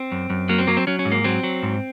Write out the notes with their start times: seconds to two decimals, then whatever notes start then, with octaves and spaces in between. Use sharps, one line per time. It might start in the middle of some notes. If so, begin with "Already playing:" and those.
Already playing: C4
0.12 F#2
0.30 F#2
0.49 F#3 A#3
0.59 C4
0.67 F#3 A#3
0.77 C4
0.87 F#3 C#4
0.99 C#4
1.05 G#2
1.12 A#3
1.24 F#3 C4
1.43 F#3
1.63 G#2